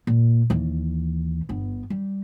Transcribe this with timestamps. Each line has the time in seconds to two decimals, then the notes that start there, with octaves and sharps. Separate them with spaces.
0.07 A#2
0.50 D#2 E3
1.49 G1 B3
1.90 G3